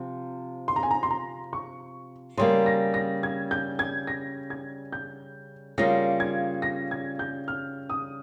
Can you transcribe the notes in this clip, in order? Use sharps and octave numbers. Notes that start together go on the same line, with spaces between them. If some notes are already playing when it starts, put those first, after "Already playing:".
Already playing: C3 F3
C6
A#5
G#5
A#5
C6
A#5
C#6
C#3 G3 A#3 C6
A#6
A#6
G#6
G6
G#6
A#6
G#6
G6
C#3 G3 A#3 F4 A#6
G#6
A#6
G#6
G6
F6
D#6